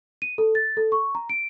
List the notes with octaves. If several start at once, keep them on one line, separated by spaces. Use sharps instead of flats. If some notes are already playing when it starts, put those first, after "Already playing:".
D#7
A4
A6
A4
C#6
A#5
D7